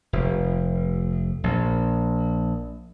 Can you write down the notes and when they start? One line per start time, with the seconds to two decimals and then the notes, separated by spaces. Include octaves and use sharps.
0.13 F1
1.44 A#1